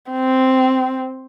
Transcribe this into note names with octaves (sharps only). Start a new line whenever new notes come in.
C4